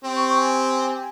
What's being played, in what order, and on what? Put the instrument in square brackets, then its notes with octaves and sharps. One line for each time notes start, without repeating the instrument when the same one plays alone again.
[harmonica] C4 G4
[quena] C#6
G#5